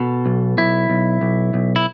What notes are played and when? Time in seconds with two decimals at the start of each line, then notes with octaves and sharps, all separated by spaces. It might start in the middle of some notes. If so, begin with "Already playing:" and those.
Already playing: B2 A4
0.26 B1
0.58 B1 E4
0.90 B1
1.21 B1
1.54 B1
1.76 E4